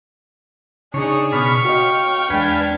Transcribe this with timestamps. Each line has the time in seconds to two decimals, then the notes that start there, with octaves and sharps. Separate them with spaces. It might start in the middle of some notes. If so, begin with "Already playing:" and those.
0.94 C#3 D4 D#4 G#4 C#5
1.33 B2 B5 C#6 F6
1.65 F#4 C#5 D#5 F5 G5
2.30 E2 G#3 D4 B4 F5 G#5